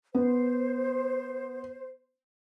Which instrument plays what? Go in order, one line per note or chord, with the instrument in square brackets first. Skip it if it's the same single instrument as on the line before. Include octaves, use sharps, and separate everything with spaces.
[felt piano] B3 [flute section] C5